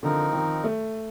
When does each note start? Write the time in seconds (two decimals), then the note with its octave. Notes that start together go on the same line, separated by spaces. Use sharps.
0.03 D3 F3 C4 D#4 A#4
0.33 D#3
0.64 A3